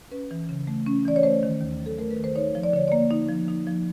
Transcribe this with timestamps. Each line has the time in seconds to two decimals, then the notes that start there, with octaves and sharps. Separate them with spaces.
0.11 C#4 B4
0.31 E3
0.49 C#3
0.67 A3
0.87 C#4
1.05 E3 D5
1.16 C#5
1.23 A3 C5
1.43 D#3
1.61 D#2
1.80 F#3
1.86 A4
1.99 A3 A#4
2.11 B4
2.17 D#3
2.24 C5
2.36 D#4 C#5
2.55 F3
2.64 D5
2.73 D3 C#5
2.88 A#3 D5
3.10 D#4
3.29 F3
3.48 D#4
3.67 F3